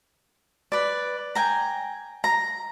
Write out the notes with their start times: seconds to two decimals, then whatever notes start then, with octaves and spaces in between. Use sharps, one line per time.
0.72 B4 D5
1.35 G5 G#5 A#5
2.24 A#5